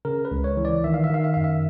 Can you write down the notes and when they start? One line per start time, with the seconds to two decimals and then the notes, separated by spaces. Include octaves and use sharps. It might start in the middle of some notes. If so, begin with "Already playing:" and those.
0.05 C#3 A#4
0.25 B4
0.31 C#2
0.44 C#5
0.57 E3
0.65 D5
0.84 D#3 E5
0.94 F5
1.04 E5
1.10 D#3 F5
1.24 E5
1.34 F#2 F5
1.44 E5